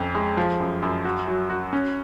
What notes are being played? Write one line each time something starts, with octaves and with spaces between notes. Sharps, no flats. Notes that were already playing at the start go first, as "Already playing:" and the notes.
Already playing: F2 C#4
G#3
F3
F#2
F#2
F#4
F#3
F#4
C#4